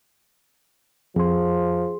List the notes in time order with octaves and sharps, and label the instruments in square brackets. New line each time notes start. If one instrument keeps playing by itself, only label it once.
[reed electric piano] F2 [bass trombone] F3 [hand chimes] G#4 C6